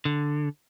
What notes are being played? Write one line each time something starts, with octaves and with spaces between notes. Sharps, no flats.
D3